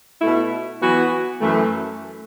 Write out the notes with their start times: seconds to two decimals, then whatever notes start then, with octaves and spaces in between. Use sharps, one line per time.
0.21 B2 A3 E4
0.81 E3 B3 F#4
1.41 F#2 E3 A3